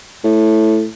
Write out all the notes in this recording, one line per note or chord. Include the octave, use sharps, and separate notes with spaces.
A2